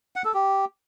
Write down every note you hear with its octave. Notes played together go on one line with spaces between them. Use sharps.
F#5
A4
G4